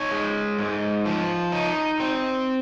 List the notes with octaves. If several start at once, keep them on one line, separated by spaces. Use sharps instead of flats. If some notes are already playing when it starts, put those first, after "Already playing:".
Already playing: D#4 C#5
G#3
G#2
F3
D#4
C4